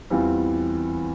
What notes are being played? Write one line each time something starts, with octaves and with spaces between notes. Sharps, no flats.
E2 E3 G3 C4 F4